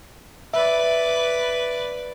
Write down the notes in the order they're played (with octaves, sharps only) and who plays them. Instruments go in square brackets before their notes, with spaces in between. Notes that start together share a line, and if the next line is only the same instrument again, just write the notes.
[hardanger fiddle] B4 D5 [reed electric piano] E5